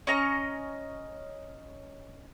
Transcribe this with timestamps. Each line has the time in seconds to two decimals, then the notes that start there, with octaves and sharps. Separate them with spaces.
0.07 C#4 D#5 A#5 C#6